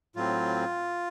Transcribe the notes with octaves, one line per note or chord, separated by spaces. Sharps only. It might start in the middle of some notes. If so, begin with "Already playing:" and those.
A2 F#3 C4 F4